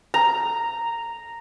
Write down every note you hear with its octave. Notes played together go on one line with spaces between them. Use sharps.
A#5